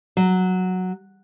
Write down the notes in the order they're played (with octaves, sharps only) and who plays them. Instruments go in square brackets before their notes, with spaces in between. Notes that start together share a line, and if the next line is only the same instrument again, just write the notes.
[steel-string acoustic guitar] F#3